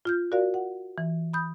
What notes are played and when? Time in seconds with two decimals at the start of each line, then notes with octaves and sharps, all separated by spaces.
0.05 F4 F6 G6
0.32 F#4 A#4 D5 F5
0.54 F#5
0.98 E3
1.33 B5 D#6 G6